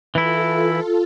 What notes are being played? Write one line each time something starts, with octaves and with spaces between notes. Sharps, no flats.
E3 E4 F4 A4